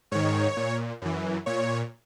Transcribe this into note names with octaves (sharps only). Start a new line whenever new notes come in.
G#2 D#3 C#5
A#2
F#2 E3
A#2 C#5